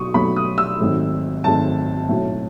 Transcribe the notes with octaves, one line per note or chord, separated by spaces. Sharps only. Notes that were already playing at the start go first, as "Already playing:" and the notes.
Already playing: B1 B2 F#3 C#6 D#6
B1 B2 F#3 A3 B5
D#6
E6
G#1 G#2 F#3 A3
G#1 G#2 F#3 A3 A5
B1 A2 F#3